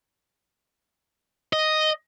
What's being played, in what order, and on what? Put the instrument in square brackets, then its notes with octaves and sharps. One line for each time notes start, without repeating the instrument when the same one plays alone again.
[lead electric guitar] D#5